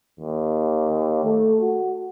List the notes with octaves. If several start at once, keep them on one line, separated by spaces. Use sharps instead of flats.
D#2
A3
F#4